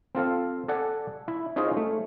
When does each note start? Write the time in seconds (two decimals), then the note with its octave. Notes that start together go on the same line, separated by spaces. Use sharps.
0.15 C4 F4 A4 F5
0.68 A4 D5 F#5 G#5
1.28 E4
1.56 C#4 D#4 F4 G#4 C5
1.77 A3